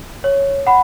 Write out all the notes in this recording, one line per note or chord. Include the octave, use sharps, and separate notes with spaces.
C#5
F#5 B5